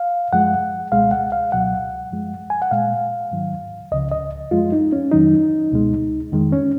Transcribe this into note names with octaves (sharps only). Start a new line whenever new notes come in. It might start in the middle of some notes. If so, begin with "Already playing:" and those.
Already playing: F5
F#2 F3 G#3 F#5
C#2 B2 G#3 F5
F#5
F5
C#2 B2 F#3 F#5
F#2 F3 G#3
G#5
F#5
A#2 G#3 F5
G#2 D#3 F#3
C#2 C#3 F3 D#5
D#5
F#2 F3 G#3 F4
D#4
C#4
F2 D#3 F#3 D#4
C#2 B2 G#3
F2 D#3 G#3
C#4